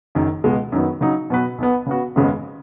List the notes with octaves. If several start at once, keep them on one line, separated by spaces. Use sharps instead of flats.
F#1 F#2 D#3
C#2 B2 G#3
F#2 D#3 F#3 B3
C#3 F#3 D#4
B2 F#3 B3 F#4 B4
B1 B2 B3
C#3 B3 F#4
G#1 F#2 C#3 G#3 B3